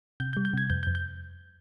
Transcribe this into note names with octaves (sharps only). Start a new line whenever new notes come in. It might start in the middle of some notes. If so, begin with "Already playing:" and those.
C3 G6
G6
G3
G6
C3 G#6
F2 G6
G6
F2
G6